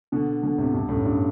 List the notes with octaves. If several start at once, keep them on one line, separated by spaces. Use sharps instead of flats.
B2 D3
B2 D3
A2 C3
G2 B2
F#2 A2
G2